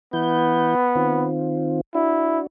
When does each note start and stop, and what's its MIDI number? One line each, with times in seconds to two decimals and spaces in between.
0.13 0.75 52
0.13 1.29 59
0.13 0.75 64
0.13 0.75 91
0.95 1.81 51
0.95 1.81 60
0.95 1.81 65
1.95 2.47 62
1.95 2.39 64
1.95 2.47 66